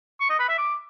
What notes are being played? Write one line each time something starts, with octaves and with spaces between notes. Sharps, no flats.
C#6
D#5
B4
E5
D6